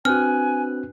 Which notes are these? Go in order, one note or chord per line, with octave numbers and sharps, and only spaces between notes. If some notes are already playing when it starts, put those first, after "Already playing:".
C4 D4 F#4 B4 G#5 F6 F#6